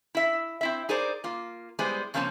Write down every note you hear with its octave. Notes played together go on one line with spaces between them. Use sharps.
E4 E5
C4 E4 E5
D#4 G#4 A#4 C5 D5
A#3 F4
G3 G#3 B3 E4 G#4 C5
C#3 F3 A#3 C4 C#4 A5